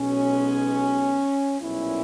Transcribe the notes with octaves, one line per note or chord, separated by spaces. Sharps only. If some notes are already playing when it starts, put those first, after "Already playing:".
Already playing: B1 B2 G#3 B3 C#4
B1 A#2 G3 B3 C#4 E4